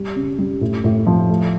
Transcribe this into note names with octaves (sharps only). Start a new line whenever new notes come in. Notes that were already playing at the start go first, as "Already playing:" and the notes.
Already playing: G3
C#3
G3
A2
A2
F3
A3